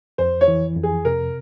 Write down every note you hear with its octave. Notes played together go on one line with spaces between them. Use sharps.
F2 C5
C#5
E3
F2
G#4
C3 A#4